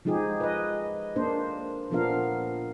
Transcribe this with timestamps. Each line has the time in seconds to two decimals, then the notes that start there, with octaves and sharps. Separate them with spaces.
0.05 F3 G#3 D#4 G4 G#4
0.40 B4 D#5
1.16 A#3 D4 C5
1.90 A#2 F3 B3 D4 A#4 F5